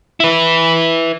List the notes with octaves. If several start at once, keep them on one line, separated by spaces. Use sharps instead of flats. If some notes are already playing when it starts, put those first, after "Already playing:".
E4 B4